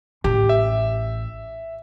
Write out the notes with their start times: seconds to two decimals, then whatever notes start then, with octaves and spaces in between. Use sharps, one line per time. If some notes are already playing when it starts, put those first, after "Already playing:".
0.24 A1 G4
0.49 E5